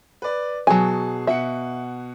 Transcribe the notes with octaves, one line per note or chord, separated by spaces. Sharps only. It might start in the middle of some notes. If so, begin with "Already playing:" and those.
B4 D5
B2 F#3 G#4 G#5 A5
B2 E5 F#5 C#7